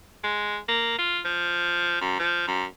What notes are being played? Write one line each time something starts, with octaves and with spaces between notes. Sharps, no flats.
G#3
A#3
F4
F3
F#2
F3
F#2